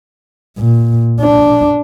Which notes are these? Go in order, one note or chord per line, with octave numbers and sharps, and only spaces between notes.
A#2
D4